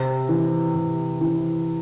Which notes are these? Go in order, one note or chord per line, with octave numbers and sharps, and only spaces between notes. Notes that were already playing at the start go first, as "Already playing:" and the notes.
Already playing: C3
E3
C3
E3